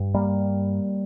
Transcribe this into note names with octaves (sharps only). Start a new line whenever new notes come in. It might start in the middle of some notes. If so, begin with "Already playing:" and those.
Already playing: G2
G3 A#3